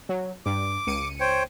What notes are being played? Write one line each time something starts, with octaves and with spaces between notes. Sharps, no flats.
F#3
G2 D6
C#2 C#7 D#7
C5 C#5 G5